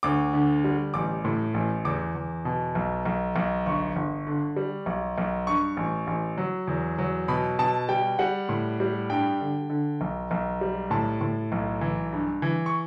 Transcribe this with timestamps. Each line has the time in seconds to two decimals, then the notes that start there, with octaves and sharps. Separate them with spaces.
0.03 D2 D6
0.34 D3
0.64 G3
0.94 A1 D6
1.25 A2
1.54 A1
1.85 E2 D6
2.15 E2
2.45 B2
2.75 B1
3.05 B1
3.36 B1
3.66 G1 C#6
3.96 G1
4.27 D3
4.56 G3
4.86 B1
5.18 B1
5.47 G2 C#6
5.77 A1
6.07 A1
6.38 F#3
6.67 E2
6.98 F#3
7.28 B2 B5
7.59 B2 A5
7.89 G3 G5
8.19 G3 F#5
8.49 A2
8.80 G3
9.10 G2 G5
9.40 D3
9.70 D3
10.01 B1
10.31 B1
10.61 G3
10.91 A2 A5
11.21 A2
11.52 B1
11.81 E3
12.13 G2
12.42 E3
12.66 C#6